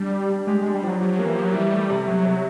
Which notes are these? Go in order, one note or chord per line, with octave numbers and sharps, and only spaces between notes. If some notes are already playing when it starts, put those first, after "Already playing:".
Already playing: G3 D4
G4
D4
G#3 G4
G#3
D4
G3
F3 F#3
F#3 G4
A#3
E3
F3 G4
F#3
E3 G3
A3
C3
C3 F#3
C3